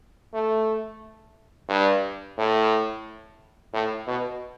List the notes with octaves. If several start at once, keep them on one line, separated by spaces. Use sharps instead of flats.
A3
G2
A2
A2
B2